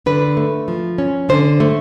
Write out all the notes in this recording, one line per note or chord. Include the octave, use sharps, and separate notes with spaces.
D3 B4
A3
F3
C#4
D3 C5
A3